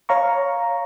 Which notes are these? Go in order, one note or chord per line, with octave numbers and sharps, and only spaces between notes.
C#5 F5 A#5 C#6